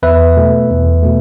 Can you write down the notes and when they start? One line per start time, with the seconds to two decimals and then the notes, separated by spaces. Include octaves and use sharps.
0.03 E2 B4 E5
0.36 B2 A3
0.70 E2
1.03 B2 A3